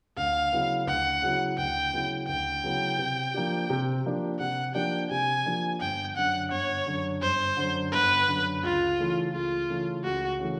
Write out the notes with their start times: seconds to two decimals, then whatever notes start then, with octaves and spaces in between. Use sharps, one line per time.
0.17 D2 F5
0.52 C#3 F#3 B3 E4
0.87 D2 F#5
1.22 C#3 F#3 B3 E4
1.58 D2 G5
1.93 C#3 F#3 B3 E4
2.28 D2 G5
2.64 C#3 F#3 B3 E4
2.98 C3
3.34 F3 A#3 D4 G4
3.70 C3
4.05 F3 A#3 D4 G4
4.39 C3 F#5
4.75 F3 A#3 D4 G4 G5
5.11 C3 G#5
5.46 F3 A#3 D4 G4
5.81 G1 G5
6.16 F#2 D3 F#5
6.51 G1 C#5
6.86 F#2 D3
7.22 G1 C5
7.57 F#2 D3
7.92 G1 B4
8.28 F#2 D3
8.63 C#2 F4
8.98 C#3 E3 A3
9.33 C#2 F4
9.69 C#3 E3 A3
10.04 C#2 F#4
10.39 C#3 E3 A3